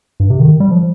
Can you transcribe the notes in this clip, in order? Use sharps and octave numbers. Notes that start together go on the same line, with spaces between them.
G2
C3
D#3
G3
F3